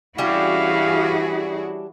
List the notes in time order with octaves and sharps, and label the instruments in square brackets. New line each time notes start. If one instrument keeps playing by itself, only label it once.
[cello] E3 E4 [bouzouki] G3 C#4 D4 [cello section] F#4 G#4 [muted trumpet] F5